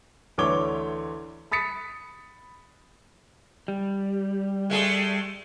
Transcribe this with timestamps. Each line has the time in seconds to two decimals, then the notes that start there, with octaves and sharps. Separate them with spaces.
0.38 D2 D3 E3 C#5 D6 G7
1.52 B5 D#6 A6 B6 C#7
3.68 G3
4.70 G#3 A3 G#4